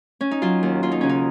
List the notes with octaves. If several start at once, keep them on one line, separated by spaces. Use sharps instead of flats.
C#4
D#4
F#3 F4
D#2
D#2 F4
D#4
C#3 C#4
D#4